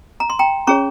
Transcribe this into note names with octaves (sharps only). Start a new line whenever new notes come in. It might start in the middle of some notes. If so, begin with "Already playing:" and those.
A#5
C6
G5 A#5
C#4 G#4 C#5 A#5 C#6